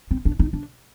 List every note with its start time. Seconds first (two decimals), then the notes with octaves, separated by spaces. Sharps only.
0.11 C4
0.25 D4
0.39 D#4
0.53 D4